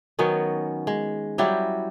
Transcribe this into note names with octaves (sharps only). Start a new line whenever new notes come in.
D#3 F#3 B3 C#4
G#3
F#3 G3 E4 G4